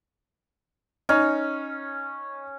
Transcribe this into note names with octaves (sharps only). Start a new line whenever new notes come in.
C#4 D#4